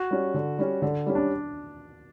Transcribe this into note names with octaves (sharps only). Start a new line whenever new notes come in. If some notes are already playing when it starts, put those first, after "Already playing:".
Already playing: F#4
G3 C#4
D3
G3 C#4
D3
G3 C#4
D4